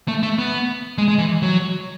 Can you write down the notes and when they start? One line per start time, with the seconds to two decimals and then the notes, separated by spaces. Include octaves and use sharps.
0.08 A3
0.23 A3
0.39 B3
0.98 G#3
1.08 G#3
1.18 E3
1.43 F#3